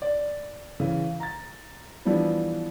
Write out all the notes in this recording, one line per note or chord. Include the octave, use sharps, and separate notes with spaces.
D5
C#3 E3
A#5 A6
E3 F3 G3 B3 D4 E4